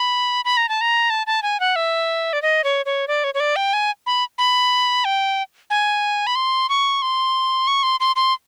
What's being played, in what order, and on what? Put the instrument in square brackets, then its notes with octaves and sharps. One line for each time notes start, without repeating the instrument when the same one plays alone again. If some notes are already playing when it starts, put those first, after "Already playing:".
Already playing: [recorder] B5
B5
A#5
A5
A#5
A5
A5
G#5
F#5
E5
D5
D#5
C#5
C#5
D5
C#5
C#5
D5
G5
G#5
B5
B5
G5
G#5
B5
C6
C#6
C6
C#6
C6
C6
C6